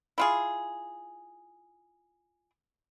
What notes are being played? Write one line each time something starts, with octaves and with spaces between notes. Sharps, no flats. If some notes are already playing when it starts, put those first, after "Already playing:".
E4 F4 G#4